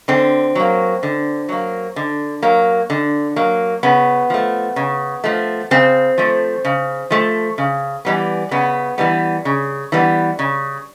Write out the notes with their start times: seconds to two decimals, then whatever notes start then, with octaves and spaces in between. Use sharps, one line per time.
0.08 D3 C4
0.55 F#3 A#3
1.03 D3
1.49 F#3 A#3
1.96 D3
2.43 F#3 A#3
2.90 D3
3.36 F#3 A#3
3.83 C#3 B3
4.30 F3 A3
4.76 C#3
5.24 F3 A3
5.71 C#3 C4
6.18 F3 A3
6.65 C#3
7.10 F3 A3
7.58 C#3
8.05 E3 G3 B3
8.51 C#3 B3
8.98 E3 G3 B3
9.45 C#3
9.92 E3 G3 B3
10.39 C#3